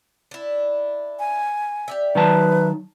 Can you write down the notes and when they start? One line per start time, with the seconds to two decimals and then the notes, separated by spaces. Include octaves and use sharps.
0.31 D4 E4
1.20 G#5
1.88 G4 D5 E5
2.15 D#3 F#3 B4 A5